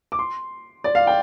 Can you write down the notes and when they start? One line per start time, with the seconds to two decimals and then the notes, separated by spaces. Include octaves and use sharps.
0.12 D6
0.19 C6
0.84 D5
0.95 F5
1.07 G5